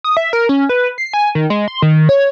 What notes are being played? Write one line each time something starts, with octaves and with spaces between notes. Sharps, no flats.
D#6
E5
A#4
C#4
B4
C7
G#5
D#3
G#3
C6
D#3
C#5